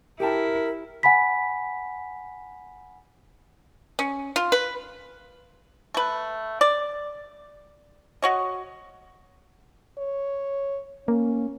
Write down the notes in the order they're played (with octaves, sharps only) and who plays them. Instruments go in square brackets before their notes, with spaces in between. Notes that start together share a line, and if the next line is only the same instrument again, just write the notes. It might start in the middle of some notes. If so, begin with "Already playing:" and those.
[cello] E4 [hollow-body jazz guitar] G4 G5 A5 [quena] A#4
[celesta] F#5 G#5 B5 B6
[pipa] C#4
F4
B4
A3 B4
D5
F#4 C#5 D#5
[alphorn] C#5
[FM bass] A#3 [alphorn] C#4